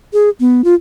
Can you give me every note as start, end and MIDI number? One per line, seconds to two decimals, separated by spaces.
0.13 0.29 68
0.40 0.64 59
0.64 0.74 65